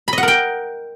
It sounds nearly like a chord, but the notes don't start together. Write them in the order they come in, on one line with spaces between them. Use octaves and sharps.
B5 D#5 F#5 A#4 G5